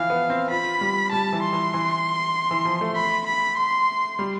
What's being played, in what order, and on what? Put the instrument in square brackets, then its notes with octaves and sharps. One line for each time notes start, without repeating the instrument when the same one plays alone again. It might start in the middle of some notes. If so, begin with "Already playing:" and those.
Already playing: [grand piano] E3 F3 [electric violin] F5
[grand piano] B3
C4
[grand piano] F4 [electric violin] B5
[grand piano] G3
[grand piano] G3 [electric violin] A5
[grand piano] E3
[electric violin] C6
[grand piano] E3
E3
E3
F3
A3
[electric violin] B5
B5
C6
[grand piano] G3